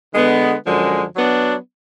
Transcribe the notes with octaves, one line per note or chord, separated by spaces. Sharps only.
D3 G#3 B3
F#2 D3 F3 G#3
F#3 B3 D4